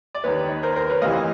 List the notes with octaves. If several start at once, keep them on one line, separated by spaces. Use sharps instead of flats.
D5
D#2 D#3 B4 C#5
A#4 C5
A#4 C5
B4 C#5
D2 C3 E3 D#5 F5